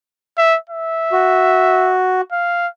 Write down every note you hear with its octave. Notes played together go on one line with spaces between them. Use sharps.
E5
E5
F#4
F5